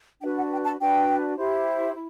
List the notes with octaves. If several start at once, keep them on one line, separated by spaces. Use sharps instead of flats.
D4 F#4 B4 G5
F#5
G5
A5
D4 F#4 B4 G5
E4 G4 C5
E4